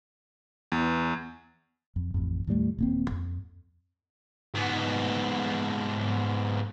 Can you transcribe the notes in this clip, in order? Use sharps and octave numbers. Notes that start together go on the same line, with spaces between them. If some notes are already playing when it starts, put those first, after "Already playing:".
E2
F2
A1 F2
D#2 A2 G3 A3
D#1 A#3 C4
F2
G#2 B3